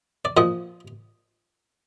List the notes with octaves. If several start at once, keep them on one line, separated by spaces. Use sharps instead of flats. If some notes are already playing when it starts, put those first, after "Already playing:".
D5
A#2 F3 D#5